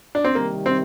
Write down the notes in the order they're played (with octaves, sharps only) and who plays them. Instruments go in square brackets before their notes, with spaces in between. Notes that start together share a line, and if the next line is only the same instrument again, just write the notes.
[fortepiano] D4
C4
[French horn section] C3 D#3 G3 [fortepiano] A#3
[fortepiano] C4